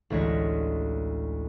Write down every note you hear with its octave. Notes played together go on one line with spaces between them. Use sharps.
A1 D2 G#3 C#5 A#6